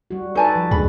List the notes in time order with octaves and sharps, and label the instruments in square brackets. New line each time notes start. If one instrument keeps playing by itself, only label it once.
[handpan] G3 F#4
[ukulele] D#4 G#5 A5 [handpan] A4 B4 D5
[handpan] F3
[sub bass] D#2 [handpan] G#3 D4 [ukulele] B5